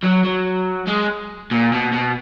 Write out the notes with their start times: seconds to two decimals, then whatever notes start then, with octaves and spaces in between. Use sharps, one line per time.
0.04 F#3
0.25 F#3
0.87 G#3
1.51 A#2
1.72 B2
1.92 B2